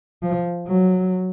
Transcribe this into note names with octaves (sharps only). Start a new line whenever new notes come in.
F3
F#3